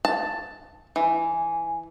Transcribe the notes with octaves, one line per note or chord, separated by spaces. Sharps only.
A5
E3 G#5